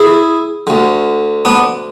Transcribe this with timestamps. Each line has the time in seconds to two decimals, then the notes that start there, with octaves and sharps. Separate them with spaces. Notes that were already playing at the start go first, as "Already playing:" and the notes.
Already playing: E4 G#4
0.67 D2 D3
1.45 B3 D4